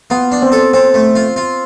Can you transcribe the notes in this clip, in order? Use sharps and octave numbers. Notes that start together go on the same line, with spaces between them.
B3 F4
D4
C4
A4
C4 A4
A3
F4
F4